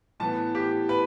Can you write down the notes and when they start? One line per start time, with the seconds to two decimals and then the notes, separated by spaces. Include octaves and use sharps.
0.20 A2 E3 B3 A5
0.55 G4
0.89 B4